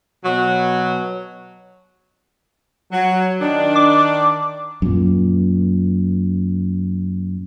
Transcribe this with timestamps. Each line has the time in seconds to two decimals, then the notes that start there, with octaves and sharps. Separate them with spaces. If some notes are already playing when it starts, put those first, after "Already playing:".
0.23 B2 F#3
2.92 F#3
3.41 D#3 D4
3.76 D6
4.82 F#2 A#2